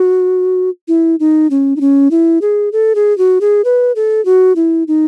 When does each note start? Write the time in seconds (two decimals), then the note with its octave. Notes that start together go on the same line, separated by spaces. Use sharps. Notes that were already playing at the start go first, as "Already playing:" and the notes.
Already playing: F#4
0.88 E4
1.20 D#4
1.51 C#4
1.76 D#4
1.81 C#4
2.11 E4
2.42 G#4
2.72 A4
2.95 G#4
3.18 F#4
3.41 G#4
3.65 B4
3.96 A4
4.25 F#4
4.56 E4
4.88 D#4